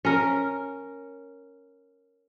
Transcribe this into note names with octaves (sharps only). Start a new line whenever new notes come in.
C#4 A#4